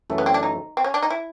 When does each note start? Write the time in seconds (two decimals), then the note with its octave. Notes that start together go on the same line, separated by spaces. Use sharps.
0.10 F#2 C#3 E3 A3
0.18 B3
0.26 C4
0.34 D4
0.43 D#4
0.77 C4
0.84 C#4
0.94 D4
1.02 D#4
1.10 E4